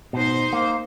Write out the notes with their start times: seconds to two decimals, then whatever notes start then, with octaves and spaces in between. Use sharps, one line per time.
0.13 B2 D#4 C5
0.53 A#3